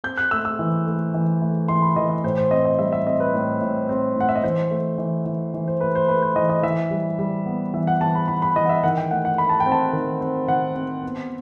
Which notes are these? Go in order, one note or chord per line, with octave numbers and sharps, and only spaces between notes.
C4 G6
F#6
A3 E6
E6
E3
A3
E3
A3
E3 C6
B5
E3 D#5
D#5
A2 C5
C5
C4 D#5
D#5
G3 E5
E5
C4 D#5
B4
A2
A2
C4
A2 F#5
E5
D#5
E3 C5
A3
E3
E3
E3
C5
A3 B4
C5
A3 B4
C5
E3 D#5
D#5
E3 E5
G3
G3
B3
E3 E5
F#5
E3 A5
B5
E3 B5
B5
E3 D#5
F#5
E5
D#3 F#5
G5
A3 F#5
F#5
A3 B5
A5
G5
C4
A5
D#3
C4
D#3 F#5
C4
B3